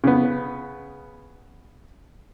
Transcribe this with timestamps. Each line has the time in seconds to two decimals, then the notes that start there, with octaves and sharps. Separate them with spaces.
0.04 C#3 B3